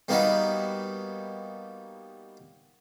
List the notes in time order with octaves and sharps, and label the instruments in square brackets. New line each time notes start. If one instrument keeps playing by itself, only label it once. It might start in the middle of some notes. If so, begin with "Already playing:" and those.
[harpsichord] G3 A#3 B3 D#4 F#4